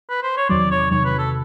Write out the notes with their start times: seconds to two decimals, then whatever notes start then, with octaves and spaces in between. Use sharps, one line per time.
0.10 B4
0.23 C5
0.37 C#5
0.49 E2 C3 D#3 F#3 D5
0.71 C#5
0.91 E2 C3 D#3 F#3 C#5
1.05 B4
1.18 A4